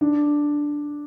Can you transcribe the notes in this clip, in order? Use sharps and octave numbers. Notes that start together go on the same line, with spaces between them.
D4